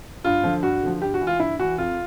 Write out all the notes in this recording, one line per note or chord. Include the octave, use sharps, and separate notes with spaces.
G2 F4
D3 F3
G2 F#4
D3 F3
G2 G4
F#4
E3
F4
G2 E4
E3 F#4
F2 F4